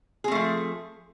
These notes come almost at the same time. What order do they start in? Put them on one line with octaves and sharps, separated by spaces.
G#4 C4 A3 F3